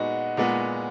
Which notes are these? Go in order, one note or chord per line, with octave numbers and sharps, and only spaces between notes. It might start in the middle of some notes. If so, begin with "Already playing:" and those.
Already playing: A#2 G#3 B3 D#4 F#4
A#2 G#3 B3